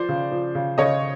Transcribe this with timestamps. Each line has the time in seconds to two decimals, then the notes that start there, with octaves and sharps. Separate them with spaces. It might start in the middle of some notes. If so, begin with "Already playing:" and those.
Already playing: F3 C5 D5
0.09 C#3
0.32 F3
0.55 C#3
0.78 C#3 C#5 D#5